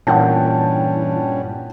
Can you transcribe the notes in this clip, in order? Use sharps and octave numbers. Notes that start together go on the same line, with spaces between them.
G2 A#2 E3 C#4 F#5 G5 A5